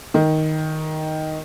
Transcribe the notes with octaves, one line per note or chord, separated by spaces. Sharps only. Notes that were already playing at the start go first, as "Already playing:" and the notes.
D#3